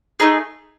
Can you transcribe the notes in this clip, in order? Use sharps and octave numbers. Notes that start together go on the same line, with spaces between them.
A3 D#4 G#4